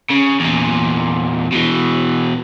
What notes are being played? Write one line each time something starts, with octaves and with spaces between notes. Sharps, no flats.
C#3
E2 A#2
B2 E3